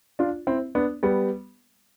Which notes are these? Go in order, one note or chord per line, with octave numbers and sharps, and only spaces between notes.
D4 F4
C4 E4
B3 D4
G3 B3